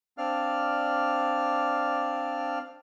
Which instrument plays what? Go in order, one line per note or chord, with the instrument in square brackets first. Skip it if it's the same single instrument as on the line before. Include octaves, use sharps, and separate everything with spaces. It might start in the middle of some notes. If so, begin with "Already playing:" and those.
[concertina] C4 D4 D5 F5 F6